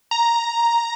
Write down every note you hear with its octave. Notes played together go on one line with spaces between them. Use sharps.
A#5